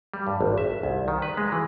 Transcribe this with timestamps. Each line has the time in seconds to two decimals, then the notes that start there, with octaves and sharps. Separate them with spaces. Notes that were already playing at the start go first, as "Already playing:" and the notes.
0.14 G3
0.27 G2
0.41 G#1
0.58 E5
0.83 C2
1.08 D#3
1.22 B4
1.37 G#3
1.52 E3